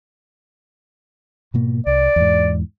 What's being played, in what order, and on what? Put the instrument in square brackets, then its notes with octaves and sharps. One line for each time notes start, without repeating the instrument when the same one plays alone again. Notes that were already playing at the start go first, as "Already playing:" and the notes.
[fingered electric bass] G#2 B2 A#3
[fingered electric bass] C2 [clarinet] D5
[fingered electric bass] E2 G#2